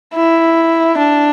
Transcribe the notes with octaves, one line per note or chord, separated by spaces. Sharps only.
E4
D4